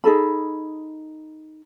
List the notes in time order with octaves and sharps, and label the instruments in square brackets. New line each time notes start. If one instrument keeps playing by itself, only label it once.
[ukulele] D#4 G#4 A4 B5